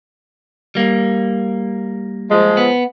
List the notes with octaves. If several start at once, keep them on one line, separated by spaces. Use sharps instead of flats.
G3 A#3
F3 G#3
B3